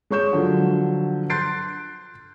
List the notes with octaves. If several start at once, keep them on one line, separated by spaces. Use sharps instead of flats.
G#3 C#5 C#6 G6 E7
D3 F3 F#3
C6 F#6 G6 A6 C7 D7